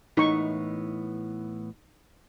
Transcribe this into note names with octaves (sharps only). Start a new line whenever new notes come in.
A2 E3 B3 D#4 C#6